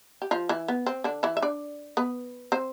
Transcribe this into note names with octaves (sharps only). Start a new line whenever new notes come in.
G4
F3 F4
E3 E4
B3
C4
D3 D4
E3 E4
E5
D4 D5
B3 B4
C4 C5